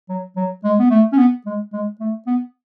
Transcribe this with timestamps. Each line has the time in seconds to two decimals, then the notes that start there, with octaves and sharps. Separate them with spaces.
0.09 F#3
0.36 F#3
0.64 G#3
0.79 B3
0.90 A3
1.13 C#4
1.18 B3
1.46 G#3
1.73 G#3
2.00 A3
2.27 B3